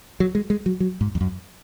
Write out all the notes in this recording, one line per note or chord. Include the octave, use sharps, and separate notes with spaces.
F#3
G#3
G#3
F#3
F#3
G#2
F2
F#2